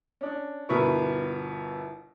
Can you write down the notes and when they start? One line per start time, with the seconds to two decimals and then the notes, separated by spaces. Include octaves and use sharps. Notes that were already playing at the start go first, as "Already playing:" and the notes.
0.21 C#4 D4
0.69 G1 B2 E4 A#4 B4 C#6